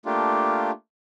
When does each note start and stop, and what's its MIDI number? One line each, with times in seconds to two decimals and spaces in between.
0.06 0.71 57
0.06 0.71 58
0.06 0.71 62
0.06 0.71 65
0.06 0.71 67